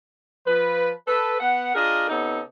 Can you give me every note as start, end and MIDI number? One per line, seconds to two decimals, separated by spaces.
0.46 0.91 53
0.46 0.91 71
1.07 1.36 69
1.07 1.36 71
1.40 1.71 59
1.40 1.71 78
1.74 2.08 62
1.74 2.08 65
1.74 2.08 68
1.74 2.08 70
1.74 2.08 75
2.09 2.41 48
2.09 2.41 59
2.09 2.41 61
2.09 2.41 63
2.09 2.41 69